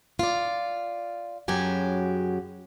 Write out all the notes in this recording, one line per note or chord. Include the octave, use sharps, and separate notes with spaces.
F4 D5
F#2 C#3 F#3 G4 G#5